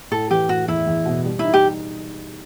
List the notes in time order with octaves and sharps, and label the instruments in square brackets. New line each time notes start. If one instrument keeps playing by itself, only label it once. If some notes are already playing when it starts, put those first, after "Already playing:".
[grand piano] A2 [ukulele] A4
[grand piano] E3 [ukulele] G4
[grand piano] A2 [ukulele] F#4
[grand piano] E2 [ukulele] E4
[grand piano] E2
B2
G3
[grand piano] D#4 [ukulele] E4
[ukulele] G4